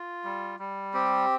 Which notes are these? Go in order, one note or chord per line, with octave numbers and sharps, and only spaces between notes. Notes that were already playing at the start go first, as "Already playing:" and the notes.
Already playing: F4
G3
G3
C4 G4